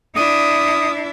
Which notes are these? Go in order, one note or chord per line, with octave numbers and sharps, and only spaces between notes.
D4 E4 D#6